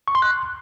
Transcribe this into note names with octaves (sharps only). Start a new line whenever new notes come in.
C#6
C6
F#6